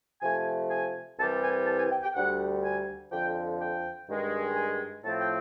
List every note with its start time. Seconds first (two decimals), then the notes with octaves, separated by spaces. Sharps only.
0.21 C3 F3 A3 G#5
0.70 G#5
1.18 C2 C3 E3 G3 A5
1.43 G#5
1.66 A5
1.78 G#5
1.90 G5
2.03 G5
2.15 D2 D3 G3 F#5
2.63 G#5
3.11 F2 D3 F3 G5
3.60 G5
4.08 G2 D#3 G#3
4.55 G#5
5.04 A2 F3 A3 C4 A5
5.20 G5